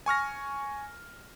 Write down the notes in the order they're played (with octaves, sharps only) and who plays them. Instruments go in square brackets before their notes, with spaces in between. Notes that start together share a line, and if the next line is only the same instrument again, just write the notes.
[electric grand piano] G#5 C#6 F6 A#6